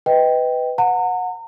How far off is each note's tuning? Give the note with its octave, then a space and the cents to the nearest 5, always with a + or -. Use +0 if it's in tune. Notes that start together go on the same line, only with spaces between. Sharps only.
B4 +15 D#5 +10 G5 +0
F#5 -20 A#5 -35